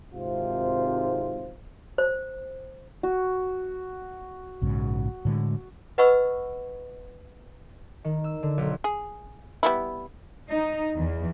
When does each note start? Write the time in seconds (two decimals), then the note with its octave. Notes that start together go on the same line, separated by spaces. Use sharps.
0.14 G#1 G#2 C3 F4 C5
1.98 C5
3.03 F#4
4.62 A#1 G#2 C#3
5.25 A2 D3 G#3
5.98 B4 D#5 F#5 B5 C#6 E6
8.04 D#3
8.24 E6
8.43 D3
8.58 B1
8.84 G#4
9.63 G3 B3 E4
10.50 D#4
10.95 E2